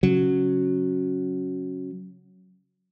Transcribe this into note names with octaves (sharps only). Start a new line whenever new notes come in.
C#3 F#3